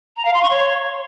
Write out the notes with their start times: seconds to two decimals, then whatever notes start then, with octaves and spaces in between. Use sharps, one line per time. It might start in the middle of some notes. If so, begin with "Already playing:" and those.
0.16 A#5
0.25 F5
0.33 C6
0.42 C#6
0.50 C#5